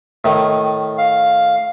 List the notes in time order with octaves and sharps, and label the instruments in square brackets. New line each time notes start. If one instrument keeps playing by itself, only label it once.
[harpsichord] A2 D#3
[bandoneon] F5